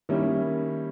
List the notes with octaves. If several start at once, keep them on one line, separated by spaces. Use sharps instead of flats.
D#3 G3 A#3 C#4 E4